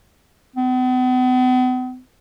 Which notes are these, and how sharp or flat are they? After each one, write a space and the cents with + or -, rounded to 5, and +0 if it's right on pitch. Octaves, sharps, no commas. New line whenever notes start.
B3 +45